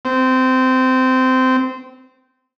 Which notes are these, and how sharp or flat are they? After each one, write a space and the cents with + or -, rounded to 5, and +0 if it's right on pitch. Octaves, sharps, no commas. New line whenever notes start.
C4 -20